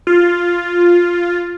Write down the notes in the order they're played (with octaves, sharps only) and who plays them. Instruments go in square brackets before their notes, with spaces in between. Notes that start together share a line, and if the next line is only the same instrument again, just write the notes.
[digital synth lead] F4